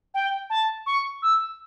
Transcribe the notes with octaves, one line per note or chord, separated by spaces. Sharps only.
G5
A5
C#6
E6